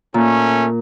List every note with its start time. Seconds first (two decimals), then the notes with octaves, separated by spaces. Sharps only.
0.14 A#2 A3 C#4